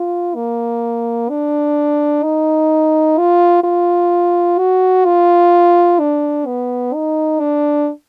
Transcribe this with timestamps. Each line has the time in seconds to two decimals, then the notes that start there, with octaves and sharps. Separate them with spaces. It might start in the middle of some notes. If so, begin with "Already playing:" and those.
Already playing: F4
0.35 A#3
1.29 D4
2.23 D#4
3.18 F4
3.64 F4
4.58 F#4
5.05 F4
6.00 D4
6.46 B3
6.94 D#4
7.40 D4